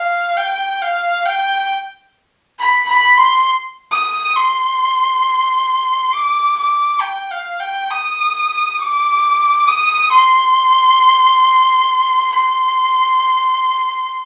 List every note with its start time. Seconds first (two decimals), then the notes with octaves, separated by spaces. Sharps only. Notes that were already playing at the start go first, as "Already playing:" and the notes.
Already playing: F5
0.37 G5
0.82 F5
1.25 G5
2.59 B5
2.89 B5
3.17 C6
3.92 D#6
4.36 C6
6.14 D6
6.58 D6
7.01 G5
7.31 F5
7.60 G5
7.91 D#6
8.79 D6
9.68 D#6
10.12 C6
12.33 C6